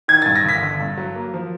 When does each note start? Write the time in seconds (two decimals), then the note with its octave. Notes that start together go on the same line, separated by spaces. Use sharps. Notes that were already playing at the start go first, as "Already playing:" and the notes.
0.08 D#3 G#6
0.22 A6
0.26 G2
0.36 A#6
0.45 G1 B6
0.62 D3
0.81 G2
0.97 F#3
1.16 A#3
1.34 F3